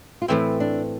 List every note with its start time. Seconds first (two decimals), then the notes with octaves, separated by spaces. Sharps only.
0.22 F4
0.28 A2 E3 A3 C4 E4
0.60 D4